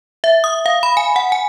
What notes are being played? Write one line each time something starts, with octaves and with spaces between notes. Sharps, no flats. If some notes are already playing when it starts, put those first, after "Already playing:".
E5
D#6
F5
B5
G#5
F#5
G#5